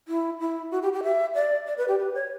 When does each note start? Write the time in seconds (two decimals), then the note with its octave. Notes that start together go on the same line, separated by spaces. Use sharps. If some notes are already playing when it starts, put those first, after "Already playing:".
0.08 E4
0.40 E4
0.72 F#4
0.82 G4
0.93 G4
1.04 E5
1.35 D5
1.67 D5
1.78 B4
1.88 G4
1.99 B4
2.14 C#5